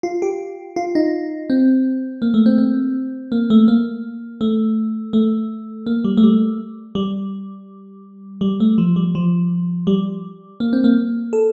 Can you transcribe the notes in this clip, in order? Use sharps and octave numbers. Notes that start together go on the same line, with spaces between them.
F4
G4
F4
D#4
C4
A#3
A3
C4
C4
A#3
A3
A#3
A3
A3
A#3
G3
A3
G3
G3
G3
A3
F3
G3
F3
G3
A#3
C4
A#3
A4